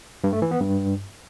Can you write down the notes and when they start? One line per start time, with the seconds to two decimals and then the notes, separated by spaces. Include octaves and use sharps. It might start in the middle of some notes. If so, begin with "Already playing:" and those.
0.24 G2
0.33 A3
0.42 E3
0.51 B3
0.60 G2